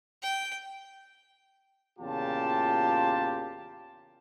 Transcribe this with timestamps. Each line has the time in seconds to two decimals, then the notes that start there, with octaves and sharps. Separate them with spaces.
0.23 G5
1.99 E2 A#2 C#3 F4 G4 A5